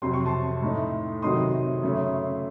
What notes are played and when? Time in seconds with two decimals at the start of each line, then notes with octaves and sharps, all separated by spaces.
0.02 F2 C3 F#3 C6
0.13 C#6
0.26 A5 C6
0.62 A2 A3 D#4
1.22 C3 D#3 F#3 A3 D#4 C6 D#6
1.83 F#2 C#3 A3 C#4